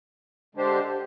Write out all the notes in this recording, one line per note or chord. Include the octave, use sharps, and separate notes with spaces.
D3 G#3 D4 G4 C5